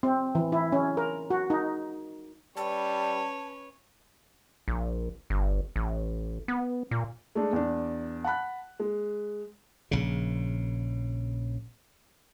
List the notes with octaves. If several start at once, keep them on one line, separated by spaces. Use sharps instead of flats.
C4
E3
E4
C#4
A#4
F#4
D#4
G3 C#4 B4 C#5 A5
A#1
G1
A1
B3
A#2
G#3 A3 D4
E2 D4
F#5 A5 B5 F#6
G#3
A#1 C#3